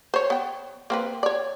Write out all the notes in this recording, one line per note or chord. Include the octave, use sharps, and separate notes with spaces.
C5 C#5
B3 G5
A#3 C4 B4
C#5 D5